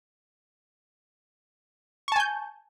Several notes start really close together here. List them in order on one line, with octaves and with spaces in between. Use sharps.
C#6 A5 G#5 G6